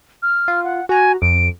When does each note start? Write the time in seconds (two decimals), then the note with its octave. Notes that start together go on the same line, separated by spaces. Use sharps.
0.22 F6
0.48 F4
0.64 F#5
0.89 F#4 G#5 A#5
1.22 F2 D7